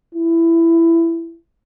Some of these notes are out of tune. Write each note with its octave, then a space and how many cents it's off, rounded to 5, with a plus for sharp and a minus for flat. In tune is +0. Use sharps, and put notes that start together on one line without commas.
E4 +15